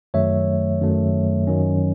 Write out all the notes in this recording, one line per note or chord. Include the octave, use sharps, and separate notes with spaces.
F#2 D#3 F#3 A3 C#5 E5
F#2 D#3 F#3 A3
F#2 D#3 F#3 C#4